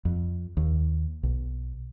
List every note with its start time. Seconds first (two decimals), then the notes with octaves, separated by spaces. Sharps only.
0.05 F2
0.57 D#2
1.23 B1